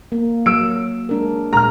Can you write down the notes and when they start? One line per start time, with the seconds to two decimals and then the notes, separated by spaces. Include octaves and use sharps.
0.12 A#3
0.46 F#3 E6 D7
1.09 G#3 D4 A#4
1.53 A#2 G#3 A#5 F6